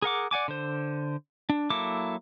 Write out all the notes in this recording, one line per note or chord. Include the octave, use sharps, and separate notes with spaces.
G#4 A#4 F#5 D6
D5 F#5 G#5 D6
D3 C5
D4
F#3 A#3 E4 A4 D6